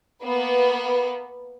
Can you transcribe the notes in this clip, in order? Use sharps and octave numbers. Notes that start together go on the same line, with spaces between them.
A#3 B3 B4